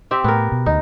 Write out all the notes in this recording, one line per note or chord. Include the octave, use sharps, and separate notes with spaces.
C4 G4 E5
A2 B3 A#4
B2
D2 D#4